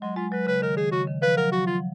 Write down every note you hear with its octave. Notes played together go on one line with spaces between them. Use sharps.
F#3 G#3
G#3 F4
F#3 B4
C#3 B4
D#3 A#4
D#3 G#4
C#3 F#4
D#3
F3 B4
F#3 A#4
F#3 F#4
F3 F4